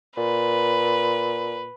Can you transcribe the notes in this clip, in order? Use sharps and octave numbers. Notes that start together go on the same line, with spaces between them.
A#2 B4